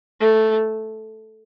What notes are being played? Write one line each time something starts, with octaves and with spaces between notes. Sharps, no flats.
A3